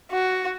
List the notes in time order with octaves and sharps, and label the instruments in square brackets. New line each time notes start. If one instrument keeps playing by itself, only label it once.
[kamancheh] F#4